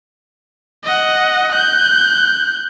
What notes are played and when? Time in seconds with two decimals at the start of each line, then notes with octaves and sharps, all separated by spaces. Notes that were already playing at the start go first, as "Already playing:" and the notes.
0.84 D#5 F#5
1.53 F#6 G6